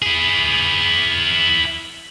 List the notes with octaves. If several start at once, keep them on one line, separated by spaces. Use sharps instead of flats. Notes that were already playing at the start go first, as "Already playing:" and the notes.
E4 G#4